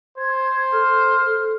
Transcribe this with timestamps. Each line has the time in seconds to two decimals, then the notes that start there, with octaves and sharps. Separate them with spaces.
0.17 C5 G#6
0.72 A4 F6